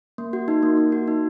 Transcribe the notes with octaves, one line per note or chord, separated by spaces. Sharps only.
A#3
F#4
D#4
A#3
A#3
F#4
D#4